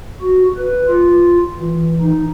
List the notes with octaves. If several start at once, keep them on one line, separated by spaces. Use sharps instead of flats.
F#4
B4
F4
E3
D#4